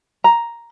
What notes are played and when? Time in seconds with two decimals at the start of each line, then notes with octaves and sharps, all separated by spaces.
0.24 A#5